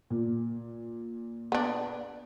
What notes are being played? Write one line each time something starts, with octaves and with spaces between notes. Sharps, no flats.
A#2
B3 D4